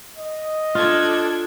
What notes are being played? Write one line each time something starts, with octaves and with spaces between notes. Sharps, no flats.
D#5
D4 F4 A4 G#6